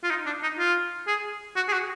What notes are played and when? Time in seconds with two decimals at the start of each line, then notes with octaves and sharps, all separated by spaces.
0.03 F4
0.10 D#4
0.26 D4
0.43 D#4
0.59 F4
1.07 G#4
1.56 F#4
1.68 G#4
1.73 F#4